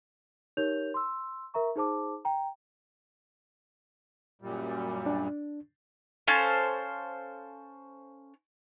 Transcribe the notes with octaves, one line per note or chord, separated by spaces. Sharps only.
D#4 G4 A#4 C#5 G6 F7
C6 E6
A#4 E5 A#5 C#6
D#4 G#4 C5 A5 D6
G5 A#5
F#2 A#2 G3
D4
C#4 A4 C5 F5